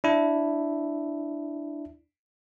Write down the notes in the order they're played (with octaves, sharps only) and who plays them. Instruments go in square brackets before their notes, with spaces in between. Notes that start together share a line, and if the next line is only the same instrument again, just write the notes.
[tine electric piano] D4 E4